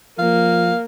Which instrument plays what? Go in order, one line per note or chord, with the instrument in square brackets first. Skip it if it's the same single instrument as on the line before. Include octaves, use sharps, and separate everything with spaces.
[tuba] F3 [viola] A#3 [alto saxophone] F5